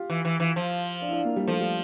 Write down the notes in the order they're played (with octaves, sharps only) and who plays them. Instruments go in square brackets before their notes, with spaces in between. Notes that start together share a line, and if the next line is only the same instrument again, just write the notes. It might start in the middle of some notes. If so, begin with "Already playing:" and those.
Already playing: [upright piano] F4 G4
[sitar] E3
E3
E3
F3
[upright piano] D4
E4
D4
A#3
G3
[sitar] F3 [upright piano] A3
[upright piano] G3